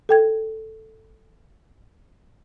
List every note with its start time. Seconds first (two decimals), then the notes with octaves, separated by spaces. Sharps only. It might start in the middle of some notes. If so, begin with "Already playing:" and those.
0.09 A4 G5 G#6